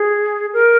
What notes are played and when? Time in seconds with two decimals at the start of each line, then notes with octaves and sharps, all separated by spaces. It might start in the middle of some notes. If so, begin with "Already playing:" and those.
Already playing: G#4
0.53 A#4